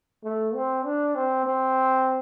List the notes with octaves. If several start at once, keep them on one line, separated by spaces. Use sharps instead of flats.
A3
C4
D4
C4
C4